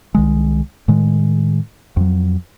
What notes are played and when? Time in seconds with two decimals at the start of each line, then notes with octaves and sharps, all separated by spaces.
0.15 C2 D#3 G#3
0.88 A2 D#3 G#3
1.97 F2 F#3